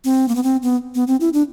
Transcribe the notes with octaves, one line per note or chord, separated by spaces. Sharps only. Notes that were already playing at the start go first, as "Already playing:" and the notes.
C4
A#3
B3
C4
B3
B3
C4
E4
D4